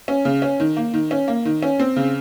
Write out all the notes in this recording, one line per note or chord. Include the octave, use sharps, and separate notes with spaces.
C#4
C#3
C#4
D#3
A#3
D#3
C#4
A#3
D#3
C#4
C4
C#3